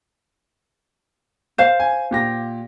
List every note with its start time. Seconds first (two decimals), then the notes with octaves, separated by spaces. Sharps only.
1.58 C5 F5 E7
1.80 G#5
2.11 A#2 G4 A#6